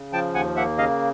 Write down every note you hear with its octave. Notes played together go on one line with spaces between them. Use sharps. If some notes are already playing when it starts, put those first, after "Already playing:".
Already playing: C#3
F3 G5 A5
D#2 F#5 G#5
A#3 E5 F#5
C#3 D#5 F5